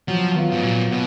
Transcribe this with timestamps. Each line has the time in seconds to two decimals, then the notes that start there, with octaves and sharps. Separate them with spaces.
0.08 F3 F#3
0.36 B3 F4
0.52 G#2
0.64 A#2 F#3
0.91 B2 B3